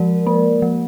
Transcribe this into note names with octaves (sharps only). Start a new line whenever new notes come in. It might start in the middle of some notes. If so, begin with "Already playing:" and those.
Already playing: F3 G#3 A#4 D5
A#3
F3